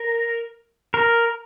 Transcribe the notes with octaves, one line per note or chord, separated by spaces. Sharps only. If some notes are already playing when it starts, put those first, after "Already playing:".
Already playing: A#4
A#4